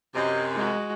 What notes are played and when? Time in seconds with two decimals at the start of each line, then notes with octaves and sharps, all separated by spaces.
0.14 F#2 C3 D#5
0.54 G#3 F#4